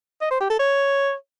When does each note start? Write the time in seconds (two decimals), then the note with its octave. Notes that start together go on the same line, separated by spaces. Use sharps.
0.21 D#5
0.31 C5
0.40 G4
0.50 A4
0.59 C#5